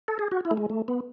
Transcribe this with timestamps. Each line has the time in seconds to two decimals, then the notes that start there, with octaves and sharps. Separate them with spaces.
0.08 A4
0.19 G#4
0.31 F#4
0.45 E4
0.51 A3
0.57 G#3
0.70 A3
0.88 B3